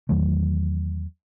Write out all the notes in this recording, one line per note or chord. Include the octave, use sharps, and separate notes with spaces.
E2 D#3 F#3 A3